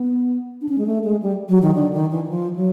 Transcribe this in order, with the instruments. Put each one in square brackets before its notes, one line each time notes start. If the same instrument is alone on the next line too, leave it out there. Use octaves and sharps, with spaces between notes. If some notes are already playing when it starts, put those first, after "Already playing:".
Already playing: [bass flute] B3
D4
C#4
G#3
A3
G#3
G3
F#3
D#3
D3
D#3
E3
E3
F3
F#3